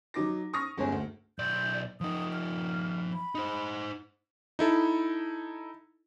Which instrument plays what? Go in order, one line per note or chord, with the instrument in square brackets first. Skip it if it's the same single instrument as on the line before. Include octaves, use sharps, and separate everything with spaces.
[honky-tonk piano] F#3 D#4 D6 A#6
C#6 D#6 F6 A#6
G1 C#2 C#5 G#5
D2
[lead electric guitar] B1 D5 [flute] G6
[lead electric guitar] F3 D#4 [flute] D#6
[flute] F6
B5
[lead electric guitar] D#4 C5
[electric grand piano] D#4 E4 A4